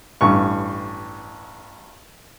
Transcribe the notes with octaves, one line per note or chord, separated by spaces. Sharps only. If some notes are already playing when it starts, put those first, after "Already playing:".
A1 G2 C#6